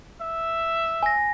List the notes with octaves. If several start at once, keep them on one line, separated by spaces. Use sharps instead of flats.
E5
G#5 A#6